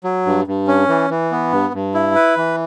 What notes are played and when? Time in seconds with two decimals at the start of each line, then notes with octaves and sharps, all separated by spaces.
0.04 F#3
0.26 G2
0.47 G2
0.67 C#4
0.89 E3
1.10 E3
1.32 B3
1.52 G2
1.73 G2
1.94 E4
2.15 B4
2.37 E3